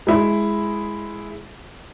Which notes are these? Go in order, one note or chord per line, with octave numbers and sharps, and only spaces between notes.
G#3 E4